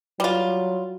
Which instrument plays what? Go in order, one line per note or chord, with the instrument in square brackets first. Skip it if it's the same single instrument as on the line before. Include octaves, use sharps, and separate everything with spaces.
[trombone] F#3 [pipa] G3 F4